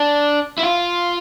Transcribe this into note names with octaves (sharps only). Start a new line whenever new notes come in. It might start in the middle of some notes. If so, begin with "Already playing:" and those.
Already playing: D4
E4
F4